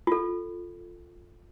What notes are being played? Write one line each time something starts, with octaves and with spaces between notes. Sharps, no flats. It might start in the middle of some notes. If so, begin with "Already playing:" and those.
F4 A4